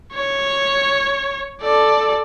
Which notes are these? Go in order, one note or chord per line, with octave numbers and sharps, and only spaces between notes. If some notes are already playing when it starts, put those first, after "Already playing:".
C#5
A4 D5